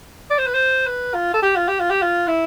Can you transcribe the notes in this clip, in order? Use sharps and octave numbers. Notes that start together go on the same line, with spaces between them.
D5
C5
B4
C5
B4
F4
A4
G4
F4
G4
F4
G4
F4
E4